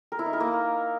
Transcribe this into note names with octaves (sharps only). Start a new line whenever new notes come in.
A#4
E4
D#4
A#4
A#3